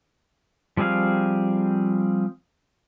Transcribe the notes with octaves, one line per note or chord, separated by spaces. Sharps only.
F3 G3 C4 G#4 F5